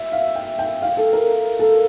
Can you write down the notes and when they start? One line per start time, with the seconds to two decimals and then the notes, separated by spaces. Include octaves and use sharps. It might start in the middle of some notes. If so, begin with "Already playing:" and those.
Already playing: E5
0.12 F5
0.35 G5
0.59 G5
0.82 F5
0.97 A4
1.13 A#4
1.59 A4